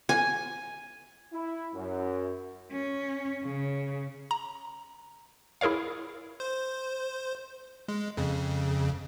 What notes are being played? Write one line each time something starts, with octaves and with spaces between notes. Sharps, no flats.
G#5
E4
F#2
C#4
C#3
A#5
E4 G#4 A#4 C#5 F5
C5
G#3
F2 C#3